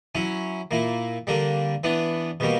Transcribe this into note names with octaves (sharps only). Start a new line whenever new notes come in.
F#3 C#4 E4
A#2 A#3 E4
D3 G3 A#3 D4
E3 B3 D4
B2 G3 A#3